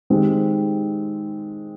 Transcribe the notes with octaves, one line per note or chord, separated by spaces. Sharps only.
D#3 G#3 C4 G4